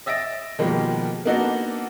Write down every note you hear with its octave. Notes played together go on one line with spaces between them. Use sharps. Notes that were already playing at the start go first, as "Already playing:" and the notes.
D#5 E5 A6 A#6 D7
B2 D#3 F3 G3 G#3 A#3
A#3 B3 D4 D#4 F#4 A4